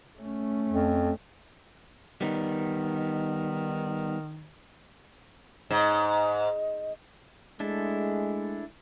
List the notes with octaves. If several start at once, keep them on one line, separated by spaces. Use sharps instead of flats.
A3 C#4
F2
D#3 G3 B3 D#4
G#2 D#5
G#3 A3 D4 E4 A4